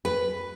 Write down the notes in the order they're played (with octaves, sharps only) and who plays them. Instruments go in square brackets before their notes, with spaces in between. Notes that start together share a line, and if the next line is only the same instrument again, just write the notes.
[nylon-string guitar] B4